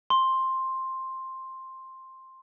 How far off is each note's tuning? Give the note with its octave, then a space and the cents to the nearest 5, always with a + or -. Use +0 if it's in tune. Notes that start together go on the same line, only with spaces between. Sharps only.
C6 +10